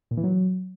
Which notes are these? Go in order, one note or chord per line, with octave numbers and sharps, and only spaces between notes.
A#2
E3
F#3